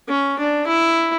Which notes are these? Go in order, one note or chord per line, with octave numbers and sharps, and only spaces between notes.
C#4
D4
E4